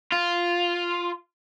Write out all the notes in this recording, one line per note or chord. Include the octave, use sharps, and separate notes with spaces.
F4